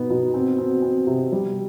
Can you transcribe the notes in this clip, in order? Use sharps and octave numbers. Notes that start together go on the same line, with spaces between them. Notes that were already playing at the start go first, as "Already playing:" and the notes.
Already playing: B2 B3 D#4
B2
C4
C4
C4
C3
G3